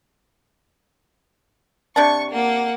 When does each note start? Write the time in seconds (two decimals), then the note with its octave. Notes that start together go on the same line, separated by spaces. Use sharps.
1.96 C3 D4 A5 C#6 C#7
2.31 A#3 F#5